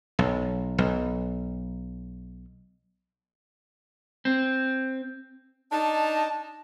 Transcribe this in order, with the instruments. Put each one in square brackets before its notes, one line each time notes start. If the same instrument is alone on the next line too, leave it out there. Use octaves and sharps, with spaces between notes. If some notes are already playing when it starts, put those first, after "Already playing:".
[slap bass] B1
B1
[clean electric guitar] C4
[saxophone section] D4 D#4 [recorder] A5